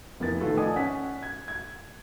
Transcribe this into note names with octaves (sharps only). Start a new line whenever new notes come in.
F1 B3 E4 A#4 A6
D#3 A3 F4 A4 B4
D5 D#5 F#5 G#5 A5 D#6
C#4 F#5 B6
G#6
G#6